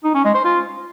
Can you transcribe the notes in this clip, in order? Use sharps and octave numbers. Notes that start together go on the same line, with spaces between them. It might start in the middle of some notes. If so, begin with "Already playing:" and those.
D#4
C#4
G#3
C5
F4